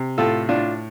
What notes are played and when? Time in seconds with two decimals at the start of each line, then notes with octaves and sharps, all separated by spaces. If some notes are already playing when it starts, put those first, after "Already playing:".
Already playing: C3
0.18 A2 F4 A4
0.49 A2 D4 F4